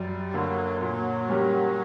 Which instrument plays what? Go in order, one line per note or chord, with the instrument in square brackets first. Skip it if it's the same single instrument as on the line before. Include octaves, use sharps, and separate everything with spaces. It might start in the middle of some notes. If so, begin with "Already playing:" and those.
Already playing: [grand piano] F#2 [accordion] G3
[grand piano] D3 A#3 [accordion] F#3
[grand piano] A#2 [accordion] F#3
[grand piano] G3 C#4 G4 A#4